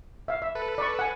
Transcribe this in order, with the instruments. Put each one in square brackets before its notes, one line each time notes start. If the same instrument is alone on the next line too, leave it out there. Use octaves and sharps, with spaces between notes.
[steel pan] E5 F5
E5
[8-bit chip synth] A4 B4
[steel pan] D5 B5 C#6
F#5 G#5